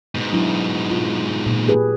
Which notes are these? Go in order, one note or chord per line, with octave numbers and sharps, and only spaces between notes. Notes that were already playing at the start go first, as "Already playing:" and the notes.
G#2 B2
F#3 D4 E4
F4
A#2
G4 G#4 B4